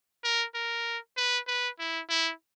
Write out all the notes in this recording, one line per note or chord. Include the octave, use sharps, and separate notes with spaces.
A#4
A#4
B4
B4
E4
E4